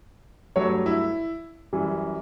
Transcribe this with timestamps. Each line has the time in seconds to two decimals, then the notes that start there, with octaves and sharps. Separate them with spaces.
0.56 G2 F#3 A3 C#5
0.86 E4
1.73 F#2 E3 G3